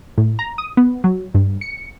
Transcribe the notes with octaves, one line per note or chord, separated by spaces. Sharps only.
A2
A#5
D#6
B3
F#3
G2
C#7